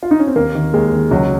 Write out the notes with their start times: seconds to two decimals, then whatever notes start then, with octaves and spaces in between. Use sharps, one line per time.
0.03 F4
0.11 D#4
0.19 C#4
0.27 C4
0.36 D#2 A#3
0.55 D#3
0.74 D#2 G#3
0.92 D#3
1.11 C#2 F#3